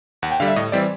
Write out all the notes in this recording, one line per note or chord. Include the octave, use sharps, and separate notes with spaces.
D#2 F#5
G5
D3 G3 F5
E5
A2 D#5
E3 G3 C4 D5